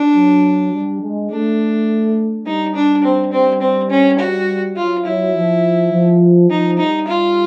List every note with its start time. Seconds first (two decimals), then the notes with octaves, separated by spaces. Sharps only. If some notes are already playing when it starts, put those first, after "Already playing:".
Already playing: D4
0.15 F#3
0.73 G3
1.01 G#3
1.30 A3 D4
2.46 G3 D#4
2.75 D4
3.04 C4
3.32 C4
3.61 C4
3.90 C#4
4.19 F#4
4.76 F#3 F4
5.05 F#3 E4
5.35 F3
5.92 F3
6.50 F3 D#4
6.79 G3 D#4
7.07 F4